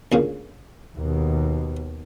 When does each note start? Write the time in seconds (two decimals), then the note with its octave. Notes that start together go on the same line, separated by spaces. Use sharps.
0.12 D2 A#2 C#3
0.97 D#2 B2